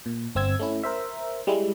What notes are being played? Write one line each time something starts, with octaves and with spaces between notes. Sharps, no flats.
A#2
G1 C4 E6 G#6
A3 C#4 E4
A#4 C5 E5
G3 G#3 E4